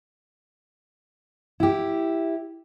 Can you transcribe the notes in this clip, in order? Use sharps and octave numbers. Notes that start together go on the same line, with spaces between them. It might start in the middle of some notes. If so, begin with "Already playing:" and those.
E4 G4